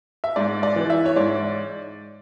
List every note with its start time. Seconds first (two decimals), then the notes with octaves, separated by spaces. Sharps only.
0.24 E5
0.36 G#2 D5
0.63 D5
0.76 E3
0.90 E5
1.06 C#5
1.16 G#2 D5